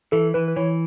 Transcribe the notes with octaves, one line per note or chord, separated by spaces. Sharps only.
E3 A4
E3 B4
B4
E3 C#5